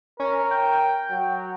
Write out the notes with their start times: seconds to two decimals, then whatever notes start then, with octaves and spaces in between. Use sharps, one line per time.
0.20 C#4 A#4
0.51 G5
1.11 F#3